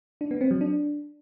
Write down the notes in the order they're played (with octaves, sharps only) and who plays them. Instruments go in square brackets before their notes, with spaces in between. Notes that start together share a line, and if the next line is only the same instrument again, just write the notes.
[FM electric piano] D4
B3
C4
F#3
D4